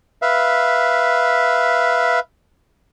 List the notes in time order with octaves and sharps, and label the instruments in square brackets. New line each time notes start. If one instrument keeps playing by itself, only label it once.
[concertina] B4 E5 F5